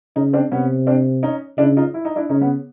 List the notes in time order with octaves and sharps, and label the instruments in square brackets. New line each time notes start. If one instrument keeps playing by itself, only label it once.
[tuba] C#3 [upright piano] C#4 D#4
[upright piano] C4 D4
[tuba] C3 [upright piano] B3 C#4
[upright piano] C4 D4
C#4 D#4
[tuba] C#3 [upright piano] D4 E4
[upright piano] D#4 F4
E4
D#4
D4 E4
[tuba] C#3 [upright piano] C#4 D#4
[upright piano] B3 C#4